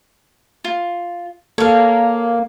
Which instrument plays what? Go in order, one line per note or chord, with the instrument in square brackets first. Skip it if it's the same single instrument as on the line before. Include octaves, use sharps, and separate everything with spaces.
[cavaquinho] F4
[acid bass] A#3 [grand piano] A4 [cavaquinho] C#5 F5